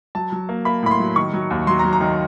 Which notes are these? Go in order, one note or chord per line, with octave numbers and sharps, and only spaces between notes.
F#3 A5
F#3
A#3
A#3 B5
A2 B5
C6
F#3
D#3 C#6
F#3
D#2
F#3 C6
A#5
F#3
A#5
D#3